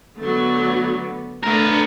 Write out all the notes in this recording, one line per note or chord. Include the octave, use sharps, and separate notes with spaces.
D3 F#3 A3 B3
A3 B3 D4 A#4